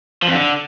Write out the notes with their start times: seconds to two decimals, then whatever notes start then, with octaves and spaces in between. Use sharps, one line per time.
0.23 F3
0.28 F2
0.34 D3